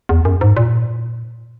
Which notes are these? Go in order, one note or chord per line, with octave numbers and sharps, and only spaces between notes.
E2
F#2
G#2
A#2